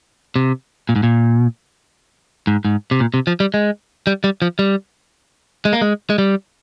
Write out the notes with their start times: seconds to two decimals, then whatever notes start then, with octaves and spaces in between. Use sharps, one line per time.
0.36 C3
0.89 A#2
0.96 G#2
1.03 A#2
2.47 G#2
2.65 G#2
2.91 C3
3.00 A#2
3.14 C3
3.27 F3
3.40 G3
3.54 G#3
4.07 G3
4.24 G3
4.42 F3
4.59 G3
5.65 G#3
5.73 A#3
5.81 G#3
6.10 G#3
6.18 G3